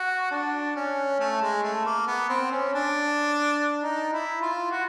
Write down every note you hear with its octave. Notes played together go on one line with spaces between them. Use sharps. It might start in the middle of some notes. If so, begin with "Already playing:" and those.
Already playing: F#4
D4
C#4
A3
G#3
A3
A#3
B3
C4
C#4
D4
D#4
E4
F4
F#4